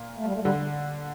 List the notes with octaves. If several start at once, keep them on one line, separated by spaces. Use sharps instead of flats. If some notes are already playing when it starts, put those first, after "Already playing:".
Already playing: A#2 A#3
A3
G3
A3
D3 G3